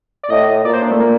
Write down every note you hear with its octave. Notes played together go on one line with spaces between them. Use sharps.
D5
A2 D#5
A#2 D5
C5
D4
A3
A#3